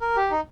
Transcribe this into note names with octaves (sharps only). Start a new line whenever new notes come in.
A#4
G4
D#4